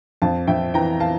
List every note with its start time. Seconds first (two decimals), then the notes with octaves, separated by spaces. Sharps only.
0.22 F2 F5 A5
0.47 F2 E5 G5
0.74 E3 G5 A#5
1.00 F5 A5